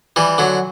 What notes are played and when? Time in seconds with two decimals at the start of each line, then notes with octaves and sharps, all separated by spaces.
0.16 E3 G3
0.38 D3 F#3